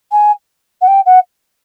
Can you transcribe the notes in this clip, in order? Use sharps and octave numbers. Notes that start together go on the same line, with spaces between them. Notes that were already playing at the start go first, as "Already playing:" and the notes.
G#5
F#5
G5
F#5